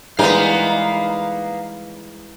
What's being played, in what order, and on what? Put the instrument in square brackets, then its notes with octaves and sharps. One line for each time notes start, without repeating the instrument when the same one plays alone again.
[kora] E3 G3 G#3 [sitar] A#3 B3 [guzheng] D#4 [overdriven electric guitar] F5